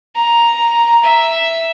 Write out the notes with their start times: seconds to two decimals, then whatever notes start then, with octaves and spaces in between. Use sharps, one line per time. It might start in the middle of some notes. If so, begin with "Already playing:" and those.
0.15 A#5
1.03 E5